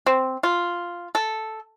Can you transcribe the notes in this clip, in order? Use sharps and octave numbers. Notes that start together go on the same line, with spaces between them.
C4
F4
A4